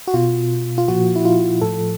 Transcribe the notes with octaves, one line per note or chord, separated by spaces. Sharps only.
F#4
B2 F4
F4
A#2 F3 F#4
E4
F4
A2 F3 A4